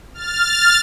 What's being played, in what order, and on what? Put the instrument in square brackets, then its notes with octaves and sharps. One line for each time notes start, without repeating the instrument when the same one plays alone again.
[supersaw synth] F6 A6